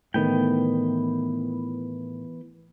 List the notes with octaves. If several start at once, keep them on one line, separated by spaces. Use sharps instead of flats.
A2 D#3 E3 B3 G5